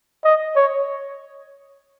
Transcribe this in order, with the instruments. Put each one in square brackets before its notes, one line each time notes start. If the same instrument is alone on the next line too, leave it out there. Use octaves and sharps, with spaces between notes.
[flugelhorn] D#5
C#5